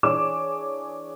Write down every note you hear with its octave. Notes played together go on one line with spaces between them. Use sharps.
E3 D4 G#4 C#5 D6 E7